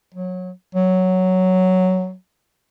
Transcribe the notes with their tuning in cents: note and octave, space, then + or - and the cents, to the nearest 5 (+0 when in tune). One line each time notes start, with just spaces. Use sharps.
F#3 -20
F#3 +5